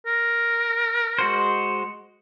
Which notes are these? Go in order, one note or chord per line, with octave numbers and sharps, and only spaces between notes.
A#4
G#3 F#4 C5